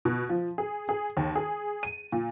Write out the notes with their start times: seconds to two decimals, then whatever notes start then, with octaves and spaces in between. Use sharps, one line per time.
0.05 B2
0.29 F3
0.58 G#4
0.89 G#4
1.17 D#2
1.35 G#4
1.83 D#7
2.12 A#2